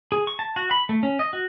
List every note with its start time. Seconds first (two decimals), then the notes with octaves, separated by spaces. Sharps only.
0.12 G#4
0.27 C#6
0.39 A5
0.56 F#4
0.71 B5
0.89 A3
1.03 C#4
1.19 D#5
1.33 F#4